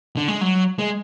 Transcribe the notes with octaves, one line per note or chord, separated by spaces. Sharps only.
D3
G#3
F#3
G#3